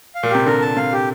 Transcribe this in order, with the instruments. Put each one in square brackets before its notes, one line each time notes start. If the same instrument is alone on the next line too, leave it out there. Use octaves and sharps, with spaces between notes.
[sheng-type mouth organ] F5
[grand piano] A#2
[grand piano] C3 [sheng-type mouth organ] G4
[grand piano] D3 [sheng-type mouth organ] A#4
[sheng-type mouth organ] A5
[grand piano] C3 [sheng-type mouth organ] F5
[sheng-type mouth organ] G4